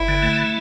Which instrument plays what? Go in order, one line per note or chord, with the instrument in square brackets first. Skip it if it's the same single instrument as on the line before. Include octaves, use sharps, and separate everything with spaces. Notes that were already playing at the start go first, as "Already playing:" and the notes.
Already playing: [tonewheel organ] G1 [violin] E4
[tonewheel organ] D3
A3